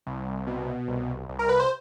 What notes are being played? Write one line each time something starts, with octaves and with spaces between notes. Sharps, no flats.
C2
B2
C2
C2
A#4
B4
C5